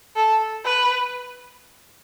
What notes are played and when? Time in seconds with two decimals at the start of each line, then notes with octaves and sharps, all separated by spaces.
0.16 A4
0.64 B4